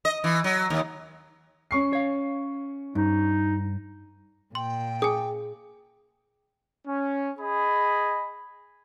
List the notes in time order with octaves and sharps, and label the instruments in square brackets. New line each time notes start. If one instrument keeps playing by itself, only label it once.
[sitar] D#5
E3
F#3
D#2
[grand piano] C#4 C#6 C7
[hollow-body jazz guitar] C#5 F5
[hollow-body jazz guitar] G2 [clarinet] D#4
[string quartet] A#2 [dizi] G5 [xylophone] C6
[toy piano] G#4 [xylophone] G#5 D#6
[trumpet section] C#4
G#4 D#5 B5